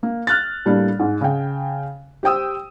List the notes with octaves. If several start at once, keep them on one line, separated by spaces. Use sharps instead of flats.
A#3
F6 F#6 A6
A2 G3 A#3 D4
G#2
C#3 G5
G4 C5 G5 D#6 E6